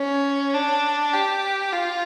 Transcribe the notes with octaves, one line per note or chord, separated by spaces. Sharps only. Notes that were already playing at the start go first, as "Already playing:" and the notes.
Already playing: C#4
D4
G4
F4